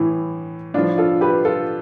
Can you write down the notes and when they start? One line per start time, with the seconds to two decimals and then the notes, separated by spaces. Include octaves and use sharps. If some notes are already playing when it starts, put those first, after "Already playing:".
Already playing: A2 E3
0.74 A2 F3 D4 F4
0.98 F4 A4
1.21 G4 B4
1.45 F4 A4